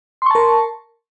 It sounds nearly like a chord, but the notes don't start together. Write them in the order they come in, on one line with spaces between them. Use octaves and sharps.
C6 C#6 A5 A#4